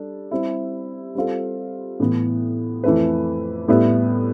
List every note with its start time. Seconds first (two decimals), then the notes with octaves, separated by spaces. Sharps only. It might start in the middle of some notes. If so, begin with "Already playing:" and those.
Already playing: G3 D4 A4
0.31 G3 C4 E4 G4
1.15 G3 C4 F4 A4
2.00 A2 E3 B3
2.84 F2 E3 A3 E4 B4
3.68 A2 G3 B3 E4 B4